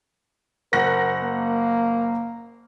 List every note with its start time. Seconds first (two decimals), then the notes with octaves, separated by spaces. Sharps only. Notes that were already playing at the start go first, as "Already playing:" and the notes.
0.73 F#1 A#4 F#5 A#6
1.23 A#3